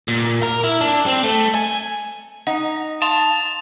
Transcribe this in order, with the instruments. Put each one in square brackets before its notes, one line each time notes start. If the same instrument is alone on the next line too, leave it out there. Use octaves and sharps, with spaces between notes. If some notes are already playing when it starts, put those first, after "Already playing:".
[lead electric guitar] A#2
A#4
E4
D4
C4
A3
G#5
[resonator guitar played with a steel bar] D#4 [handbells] F#5
[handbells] F5 C6 [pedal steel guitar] A5 [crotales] D#6 A6 F7